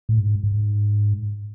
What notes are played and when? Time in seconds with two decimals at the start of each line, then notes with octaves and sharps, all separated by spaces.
0.09 A2
0.18 G#2
0.43 G#2